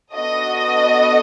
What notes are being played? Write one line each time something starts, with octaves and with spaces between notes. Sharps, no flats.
B3 D4 F#4 A4 D#5